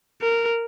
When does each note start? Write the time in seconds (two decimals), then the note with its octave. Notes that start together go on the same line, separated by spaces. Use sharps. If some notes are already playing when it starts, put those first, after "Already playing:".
0.22 A#4